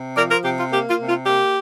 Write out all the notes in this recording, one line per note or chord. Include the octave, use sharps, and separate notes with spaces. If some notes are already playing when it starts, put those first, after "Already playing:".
Already playing: C3
F3 A#4 D5
F4 A#4
C3 G4
F4
A#3 G4
F4
C3
F4
A#3 G4